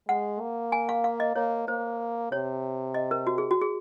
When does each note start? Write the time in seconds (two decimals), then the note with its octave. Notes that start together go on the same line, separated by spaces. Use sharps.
0.09 G#3 F#5
0.41 A#3
0.72 G#5
0.89 F5
1.04 F5
1.20 D#5
1.36 A#3 C#5
1.68 A#3 C5
2.32 C3 C#5
2.94 D#5
3.11 A#4
3.27 F#4
3.38 G#4
3.51 F#4
3.61 G#4